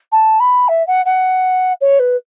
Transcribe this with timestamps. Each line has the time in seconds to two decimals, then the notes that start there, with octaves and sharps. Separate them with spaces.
0.12 A5
0.40 B5
0.68 E5
0.87 F#5
1.06 F#5
1.81 C#5
1.99 B4